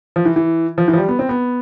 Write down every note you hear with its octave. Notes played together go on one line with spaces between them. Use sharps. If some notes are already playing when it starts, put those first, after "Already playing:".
F3
E3
E3
F3
E3
F3
G3
B3
C4
B3